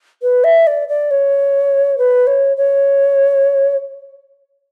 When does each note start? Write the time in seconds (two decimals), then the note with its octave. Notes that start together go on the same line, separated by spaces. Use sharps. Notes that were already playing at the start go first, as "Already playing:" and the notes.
0.22 B4
0.44 E5
0.67 D5
0.88 D5
1.11 C#5
1.98 B4
2.27 C#5
2.56 C#5